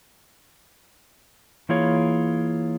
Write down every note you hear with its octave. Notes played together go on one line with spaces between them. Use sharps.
E3 A#3 E4 F4 G#4 C#5